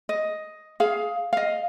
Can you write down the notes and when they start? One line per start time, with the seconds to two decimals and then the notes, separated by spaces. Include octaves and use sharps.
0.09 D#5
0.80 G#4 F5
1.33 D#5 F5